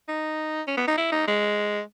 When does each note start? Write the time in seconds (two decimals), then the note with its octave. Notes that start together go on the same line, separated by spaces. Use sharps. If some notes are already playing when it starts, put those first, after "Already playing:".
0.08 D#4
0.67 C#4
0.77 B3
0.87 D#4
0.97 E4
1.12 D#4
1.28 G#3